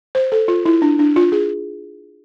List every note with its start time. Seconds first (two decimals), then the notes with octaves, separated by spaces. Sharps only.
0.15 C5
0.32 A4
0.48 F4
0.66 E4
0.82 D4
0.99 D4
1.16 F4
1.32 G#4